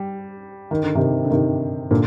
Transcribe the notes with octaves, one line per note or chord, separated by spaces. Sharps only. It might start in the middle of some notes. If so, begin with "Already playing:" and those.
Already playing: G3
D#3
D3
C3 D#3
D3
C3 D#3
A#2 D3